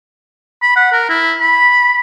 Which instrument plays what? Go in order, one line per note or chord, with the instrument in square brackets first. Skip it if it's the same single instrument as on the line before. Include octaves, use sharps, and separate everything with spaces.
[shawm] B5
F#5
A#4
E4
B5